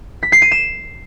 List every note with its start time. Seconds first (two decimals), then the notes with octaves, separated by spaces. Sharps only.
0.23 B6
0.32 C7
0.42 D#7
0.51 E7